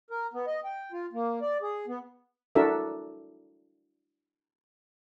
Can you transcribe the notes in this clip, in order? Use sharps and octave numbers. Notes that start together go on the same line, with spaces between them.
A#4
B3
D#5
G5
F4
A#3
D5
G#4
B3
D4 E4 F#4 A4 A#4 E5